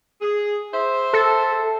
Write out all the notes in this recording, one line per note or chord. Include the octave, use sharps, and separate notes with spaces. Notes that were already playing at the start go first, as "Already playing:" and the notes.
G#4
C5 E5
A4